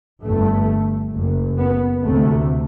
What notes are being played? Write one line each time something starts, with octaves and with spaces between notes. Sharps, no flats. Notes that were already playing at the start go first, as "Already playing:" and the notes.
G1 G2 A3
F#1 F#2
B3
D2 C3 A3